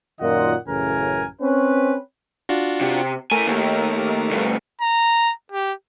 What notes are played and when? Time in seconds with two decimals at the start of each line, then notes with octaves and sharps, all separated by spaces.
0.20 F#2 A#2 D#3 F4 D#5 F#5
0.67 A1 F#2 C#3 E3 A#4 G#5
1.41 C4 C#4 B4
2.49 D4 F4 F#4
2.81 C3
3.32 A2 A3 A#4 G#5
3.47 D#2
4.31 D2 G2
4.81 A#5
5.52 G4